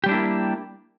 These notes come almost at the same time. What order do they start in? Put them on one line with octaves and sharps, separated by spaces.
G4 G3 D4 E4 A#3